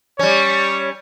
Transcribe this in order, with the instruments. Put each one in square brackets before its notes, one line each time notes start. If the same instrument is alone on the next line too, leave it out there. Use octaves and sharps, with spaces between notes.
[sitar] G3 C#4 [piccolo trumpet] C#5